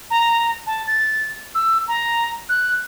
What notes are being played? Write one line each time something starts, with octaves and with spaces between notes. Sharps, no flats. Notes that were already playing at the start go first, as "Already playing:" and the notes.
A#5
A5
A6
E6
A#5
F#6